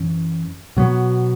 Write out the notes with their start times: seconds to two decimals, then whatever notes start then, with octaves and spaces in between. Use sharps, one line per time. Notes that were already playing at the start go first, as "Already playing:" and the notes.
Already playing: F#2 E3 C#4
0.77 B2 F#3 B3